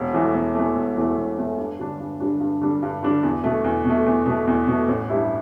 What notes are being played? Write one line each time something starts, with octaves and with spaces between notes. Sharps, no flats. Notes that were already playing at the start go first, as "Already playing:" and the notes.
Already playing: E1
E2 E3 A3
E1
E2 E3 A3
E1
E2 E3 A3
E1
E2 E3 A3
G2
D3 G3 D4
G2
D3 G3 D4
G2
D3 G3 D4
G2
D3 G3 D4
E2
B2 A3
E2
B2
A3
E2
B2 A3
E2
B2 A3
A1
G2 G3 E4 G4